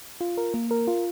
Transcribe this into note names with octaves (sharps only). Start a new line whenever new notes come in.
F4
A#4
A#3
A#4
F4